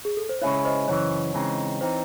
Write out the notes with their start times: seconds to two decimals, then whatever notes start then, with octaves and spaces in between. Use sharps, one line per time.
0.05 G#4
0.17 A4
0.29 C5
0.42 C#3 G#3 C#4 E4 C#5
0.65 C5 D#5
0.88 F#2 C#3 E3 C#5
1.34 C#3 E3 G#3 C4 D#4
1.81 E3 C4 D#4 C5